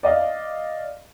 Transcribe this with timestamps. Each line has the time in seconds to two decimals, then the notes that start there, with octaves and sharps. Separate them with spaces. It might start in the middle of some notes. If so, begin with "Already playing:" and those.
0.03 D5 D#5 F5